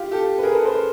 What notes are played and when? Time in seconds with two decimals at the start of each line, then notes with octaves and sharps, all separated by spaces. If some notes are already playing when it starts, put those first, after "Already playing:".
Already playing: F4 G4
0.11 G4 A4
0.38 B4
0.43 G#4 A#4
0.54 A4 B4
0.64 A#4 C5